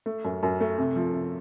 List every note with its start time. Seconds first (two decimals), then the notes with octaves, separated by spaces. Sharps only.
0.06 A3
0.25 F#2
0.43 F#2
0.60 A3
0.78 C3
0.96 F3
1.14 C3